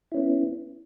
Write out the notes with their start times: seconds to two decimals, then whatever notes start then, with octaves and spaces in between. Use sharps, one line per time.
0.12 E4
0.14 C#4
0.17 B3